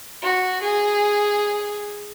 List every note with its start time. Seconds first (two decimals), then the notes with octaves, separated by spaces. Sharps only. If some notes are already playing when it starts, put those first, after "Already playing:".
0.22 F#4
0.62 G#4